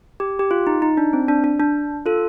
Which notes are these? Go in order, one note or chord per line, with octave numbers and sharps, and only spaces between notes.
G4
G4
F4
D#4
D#4
D4
C4
D4
D4
D4
F4 A4